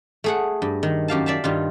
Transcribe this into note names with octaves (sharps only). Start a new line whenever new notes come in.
A3 G#4 F#5
G2
D#3
F#2 G4 F5 A5
D5 E5 F5 A5
G2 D#3 F4